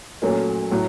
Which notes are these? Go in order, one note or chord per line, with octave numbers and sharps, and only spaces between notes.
A#2 F#3 A3 C#4
A2 F#3